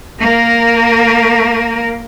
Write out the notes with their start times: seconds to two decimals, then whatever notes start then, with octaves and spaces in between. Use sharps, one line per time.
0.20 A#3 A#4